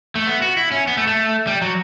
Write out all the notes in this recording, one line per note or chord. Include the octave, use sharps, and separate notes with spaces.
A3
B3
F#4
E4
C#4
B3
A3
A3
G3
F#3